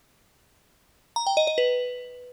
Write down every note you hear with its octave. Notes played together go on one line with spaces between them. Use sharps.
A#5
G5
D#5
D#5
B4